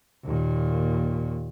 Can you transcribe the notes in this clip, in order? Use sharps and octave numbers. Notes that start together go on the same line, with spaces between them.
D#2 A#2